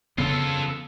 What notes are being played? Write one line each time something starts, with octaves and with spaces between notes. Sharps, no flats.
C#3 B3 F4 A4